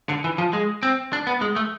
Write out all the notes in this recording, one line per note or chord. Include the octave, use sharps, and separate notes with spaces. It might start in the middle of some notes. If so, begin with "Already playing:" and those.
D3
E3
F3
G#3
C4
D4
B3
G#3
A3